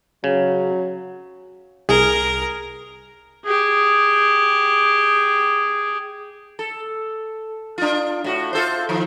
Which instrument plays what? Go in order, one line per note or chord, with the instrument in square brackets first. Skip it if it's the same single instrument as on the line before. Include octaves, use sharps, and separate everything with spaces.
[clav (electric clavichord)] C#3 [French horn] F#3
[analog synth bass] C2 [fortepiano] G#4 [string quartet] A#4
[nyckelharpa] G4 G#4
[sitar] A4
D4 F4
A2 F#4
F4 A4 C5
D#3 F3